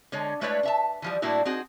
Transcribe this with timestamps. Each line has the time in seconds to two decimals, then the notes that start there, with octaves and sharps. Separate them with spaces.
0.12 D3 G#3 C#5
0.41 G#3 A3 E4 B4 C#5 D5
0.63 D4 E5 A5
1.02 E3 F3 G3
1.22 A2 G3 A#3 D4 E4 F#4
1.45 C4 D#4 F#4 G#4